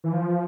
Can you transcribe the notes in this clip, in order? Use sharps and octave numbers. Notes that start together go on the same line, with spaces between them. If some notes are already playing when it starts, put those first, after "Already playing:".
E3
F3